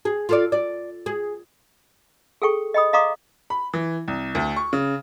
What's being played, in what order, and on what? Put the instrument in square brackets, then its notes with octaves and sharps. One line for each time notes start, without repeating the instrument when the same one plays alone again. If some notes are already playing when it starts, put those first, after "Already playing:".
[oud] G#4
F4 A4 D5
D5
G#4
[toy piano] G#4 A4 G5 C#6
D#5 G5 B5 D#6
D#5 F5 A#5 C6 D6 D#6
[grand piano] B5
E3
C2
D2
C#6
C#3